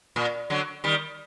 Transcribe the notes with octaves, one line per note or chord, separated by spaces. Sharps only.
A#2
D3 F#3
D#3 G3